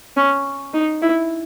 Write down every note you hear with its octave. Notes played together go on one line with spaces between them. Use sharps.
C#4
D#4
E4